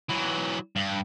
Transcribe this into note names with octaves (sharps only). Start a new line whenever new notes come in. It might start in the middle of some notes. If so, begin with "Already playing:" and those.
E3 F#3
G2